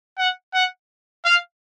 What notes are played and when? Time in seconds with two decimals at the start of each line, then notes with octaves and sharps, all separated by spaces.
0.18 F#5
0.54 F#5
1.25 F5